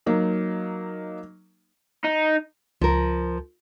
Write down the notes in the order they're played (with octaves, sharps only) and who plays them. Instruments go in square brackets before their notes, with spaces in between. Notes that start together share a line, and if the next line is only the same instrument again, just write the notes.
[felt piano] F#3 A#3 D#4
[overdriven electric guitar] D#4
[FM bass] C#2 [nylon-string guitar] F3 A#4